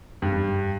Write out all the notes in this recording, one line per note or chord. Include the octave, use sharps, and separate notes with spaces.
G2